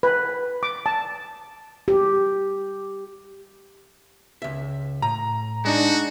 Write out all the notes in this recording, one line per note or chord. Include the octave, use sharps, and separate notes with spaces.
B4
D6
A5
G4
C#2 E5
A2 A#5
G#3 D4 D#4 F#4